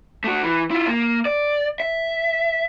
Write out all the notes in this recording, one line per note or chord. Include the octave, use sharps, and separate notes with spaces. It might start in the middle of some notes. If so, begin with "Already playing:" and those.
A3 F#4
E3
E4 F4
A#3
D5
E5